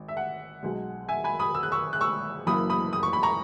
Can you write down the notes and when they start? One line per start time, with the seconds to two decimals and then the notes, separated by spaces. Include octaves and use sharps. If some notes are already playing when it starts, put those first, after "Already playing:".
Already playing: G#1
0.08 E5
0.17 F#5
0.63 B1 B2 G#3
1.09 E5 G#5
1.24 G#5 B5
1.39 B5 D#6
1.55 E6
1.63 F#6
1.72 C#6 E6
1.93 F#6
2.01 C#6 E6
2.47 F#1 F#2 E3 A#3 B5 D#6
2.70 B5 D#6
2.93 D#6
3.03 C#6
3.13 B5
3.23 A#5 C#6